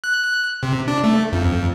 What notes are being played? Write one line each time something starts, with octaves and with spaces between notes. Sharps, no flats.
F#6
C3
D4
A3
F2